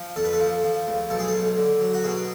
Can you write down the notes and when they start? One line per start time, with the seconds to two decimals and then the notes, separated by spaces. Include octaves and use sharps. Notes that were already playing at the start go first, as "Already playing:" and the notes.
Already playing: F3
0.16 F2 A4
0.25 B4
0.33 A4
0.39 F3
0.63 F3
0.87 C#2
1.10 B1 A4
1.19 G#4
1.28 A4
1.33 B1
1.57 D3
1.81 F#3
1.94 F#4
2.04 B2 G#4